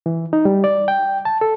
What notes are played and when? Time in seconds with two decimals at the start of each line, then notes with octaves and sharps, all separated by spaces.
0.06 E3
0.33 D#4
0.45 G3
0.64 D5
0.88 G5
1.25 A5
1.41 A4